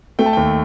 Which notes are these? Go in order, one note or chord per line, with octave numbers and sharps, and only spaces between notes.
A3 G5
A5
D#2 G5